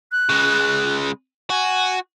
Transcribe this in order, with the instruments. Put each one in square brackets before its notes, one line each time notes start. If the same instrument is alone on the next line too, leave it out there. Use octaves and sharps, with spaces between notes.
[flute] F#6
[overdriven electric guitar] C#3 G#3
[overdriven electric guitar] F#4 [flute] G#5